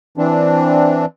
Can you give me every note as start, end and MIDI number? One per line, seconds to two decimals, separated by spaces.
0.18 1.05 52
0.18 1.05 60
0.18 1.05 62